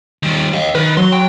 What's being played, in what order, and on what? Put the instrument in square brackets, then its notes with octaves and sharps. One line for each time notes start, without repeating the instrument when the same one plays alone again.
[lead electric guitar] D#3 G3
D#5 F5
[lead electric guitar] D#3 [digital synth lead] B4
[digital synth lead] F#3 [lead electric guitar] C6
[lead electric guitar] G5